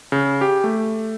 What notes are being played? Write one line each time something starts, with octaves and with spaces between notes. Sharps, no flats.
C#3
G4
A3